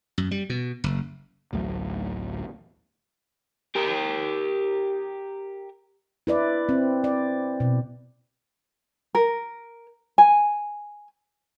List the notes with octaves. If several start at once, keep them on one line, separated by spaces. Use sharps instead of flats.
F#2
G3
B2
F#1
A1 D2 A2 F#3
G4 A#4
E4 B4 D5
C4
D5
B2
A#4
G#5